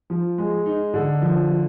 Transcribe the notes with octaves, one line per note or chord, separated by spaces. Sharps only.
F3
G#3
D#4
D3
F3
F3